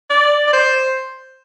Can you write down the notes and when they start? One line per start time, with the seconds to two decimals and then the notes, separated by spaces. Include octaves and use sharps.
0.10 D5
0.47 D5
0.53 C5